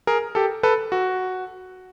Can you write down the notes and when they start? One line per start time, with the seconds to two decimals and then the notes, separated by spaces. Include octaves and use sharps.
0.07 G#4 A#4
0.35 G4 A4
0.63 A4 B4
0.92 F#4